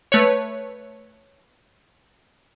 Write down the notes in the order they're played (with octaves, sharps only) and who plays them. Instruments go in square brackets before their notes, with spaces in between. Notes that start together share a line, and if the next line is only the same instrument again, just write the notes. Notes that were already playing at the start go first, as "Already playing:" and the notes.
[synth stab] A3 B4 C#5